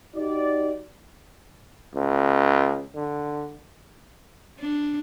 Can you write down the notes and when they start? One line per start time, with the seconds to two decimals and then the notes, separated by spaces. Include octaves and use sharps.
0.16 D#4 F#4 G4 D5
1.94 C#2
2.95 D3
4.60 D4